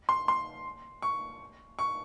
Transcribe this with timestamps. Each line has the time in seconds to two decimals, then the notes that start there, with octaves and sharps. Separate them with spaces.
0.09 C6
0.28 C6
1.02 C#6
1.79 C#6